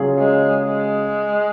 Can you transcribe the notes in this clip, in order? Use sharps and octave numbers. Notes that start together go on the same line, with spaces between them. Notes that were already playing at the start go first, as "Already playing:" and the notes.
Already playing: C#3 F#3 C#4 F4 G#4
G#3
G#3